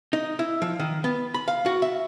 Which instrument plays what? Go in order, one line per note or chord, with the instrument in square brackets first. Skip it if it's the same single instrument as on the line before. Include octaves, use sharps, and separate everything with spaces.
[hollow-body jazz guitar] D#4
E4
F3
D#3
B3
B5
F5
F#4
E5